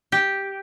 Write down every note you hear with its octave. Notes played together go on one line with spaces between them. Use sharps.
G4